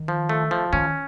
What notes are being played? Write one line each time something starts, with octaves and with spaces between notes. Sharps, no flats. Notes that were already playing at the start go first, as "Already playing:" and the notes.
Already playing: D#3
F3
A3
F3
D#3 C#4